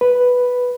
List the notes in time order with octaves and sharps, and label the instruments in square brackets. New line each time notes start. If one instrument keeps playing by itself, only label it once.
[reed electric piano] B4